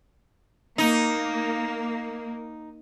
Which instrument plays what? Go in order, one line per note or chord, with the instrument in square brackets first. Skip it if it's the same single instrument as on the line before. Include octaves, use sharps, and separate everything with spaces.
[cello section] A#3 [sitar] D#4